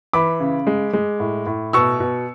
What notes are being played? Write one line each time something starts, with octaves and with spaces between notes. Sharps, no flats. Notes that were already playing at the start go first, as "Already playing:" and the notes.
E3 B5 D6
C#3
G#3
G#3
A2
A2
B2 C#6 E6
B2